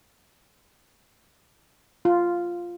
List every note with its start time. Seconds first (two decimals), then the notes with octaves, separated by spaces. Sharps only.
2.05 F4